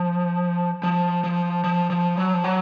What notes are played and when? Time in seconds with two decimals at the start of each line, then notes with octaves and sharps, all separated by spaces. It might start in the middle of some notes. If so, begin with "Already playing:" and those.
Already playing: F3
0.83 F3
1.24 F3
1.64 F3
1.90 F3
2.17 F#3
2.34 F3
2.44 F#3